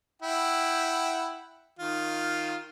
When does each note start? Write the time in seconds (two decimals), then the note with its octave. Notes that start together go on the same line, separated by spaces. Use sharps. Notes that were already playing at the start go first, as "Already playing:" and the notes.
0.22 E4 F#5 G5
1.79 D#3 F4